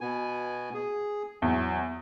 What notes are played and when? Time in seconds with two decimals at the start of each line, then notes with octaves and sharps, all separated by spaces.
0.01 B2 B3 G#5
0.74 G#4
1.42 E2 F#3